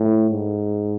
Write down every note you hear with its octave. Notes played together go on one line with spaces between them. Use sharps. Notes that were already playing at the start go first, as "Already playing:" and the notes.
Already playing: A2
G#2